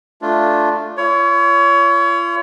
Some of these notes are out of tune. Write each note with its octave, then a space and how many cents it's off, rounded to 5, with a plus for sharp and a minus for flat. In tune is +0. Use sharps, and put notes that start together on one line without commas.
A3 +0 D4 +0 F4 +0
F4 -40 C#5 +30